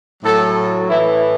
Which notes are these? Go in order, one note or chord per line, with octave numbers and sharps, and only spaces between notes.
A2 F#3 A4
A2 E3 E4